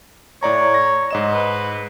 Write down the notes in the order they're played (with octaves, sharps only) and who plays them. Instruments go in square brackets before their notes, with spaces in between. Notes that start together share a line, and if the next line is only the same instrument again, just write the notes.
[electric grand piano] A2 D5 A#5 [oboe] C#5
[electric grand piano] A#6
G#2 D#5 E7
[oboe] B4